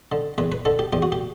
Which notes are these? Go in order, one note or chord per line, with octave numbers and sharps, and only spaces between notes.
D3
E2 B4
B4
D3 A4
G4
E2 G4
F#4
G4